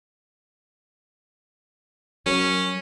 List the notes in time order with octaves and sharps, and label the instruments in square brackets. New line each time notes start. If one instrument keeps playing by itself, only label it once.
[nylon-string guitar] F#3 F#4 A#4 [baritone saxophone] C#4